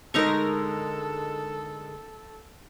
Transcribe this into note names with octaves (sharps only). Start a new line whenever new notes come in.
D3 G#3 D#4 A4 A#4 A#5 C#6